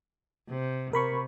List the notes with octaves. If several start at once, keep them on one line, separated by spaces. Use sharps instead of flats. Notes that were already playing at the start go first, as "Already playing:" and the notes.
C3
C3 A#4 B5 C#6